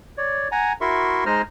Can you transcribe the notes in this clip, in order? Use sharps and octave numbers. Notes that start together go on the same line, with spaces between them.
C#5 D5
F#5 G#5 A#5
E4 F#4 A#4 E5 C6 C#6
G#3 D#4 C5 D#5 F6